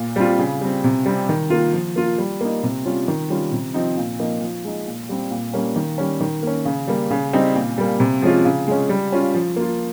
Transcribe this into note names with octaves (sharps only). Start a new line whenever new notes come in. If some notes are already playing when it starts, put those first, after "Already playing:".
Already playing: A#2
G3 C4 F4
C#3
G3 C4
C3
G3 C4
D#3
A#3 F4
F3
A#3 F4
G3
A#3 D#4
C3
G3 C#4 F4
D#3
G3 C#4 F4
C3
F3 C4 D#4
A#2
F3 A#3 D#4
F3
G#3 D#4
A#2
G3 C4
A#2
G3 A#3 C#4
D#3
G3 C#4
D#3
A#3 C#4
C#3
G3 A#3
C#3
G3 C4 D#4
A#2
G3 A#3
C3
F3 G#3 C#4 F4
C#3
G#3 C#4
G3
C#4 F4
F3
A#3 F4